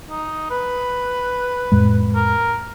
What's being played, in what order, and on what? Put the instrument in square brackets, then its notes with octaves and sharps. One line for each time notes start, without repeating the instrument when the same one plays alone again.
[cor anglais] D#4
B4
[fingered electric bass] F2 A2 G#3
[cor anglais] A#4